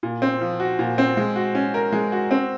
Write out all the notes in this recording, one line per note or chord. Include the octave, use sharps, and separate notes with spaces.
A#2
C4
F3
F#4
A#2
C4
G#3
F#4
C#4
A#4
G#3
F#4
C4